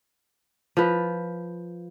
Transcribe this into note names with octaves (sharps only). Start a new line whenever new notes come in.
F3 B4